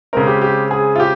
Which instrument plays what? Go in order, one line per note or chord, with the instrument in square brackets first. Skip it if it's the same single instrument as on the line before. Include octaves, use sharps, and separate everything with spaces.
[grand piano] C#3 G#3 C4 A#4
G4
G4
G#4
F4
G4